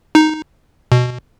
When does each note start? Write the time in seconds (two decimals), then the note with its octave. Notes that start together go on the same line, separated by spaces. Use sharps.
0.15 D#4
0.92 B2